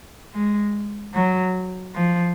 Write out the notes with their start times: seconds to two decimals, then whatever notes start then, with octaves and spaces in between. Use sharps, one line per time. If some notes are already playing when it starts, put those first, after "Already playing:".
0.34 G#3
1.14 F#3
1.94 F3